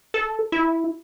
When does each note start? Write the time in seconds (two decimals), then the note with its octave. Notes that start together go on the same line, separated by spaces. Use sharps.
0.14 A4
0.52 E4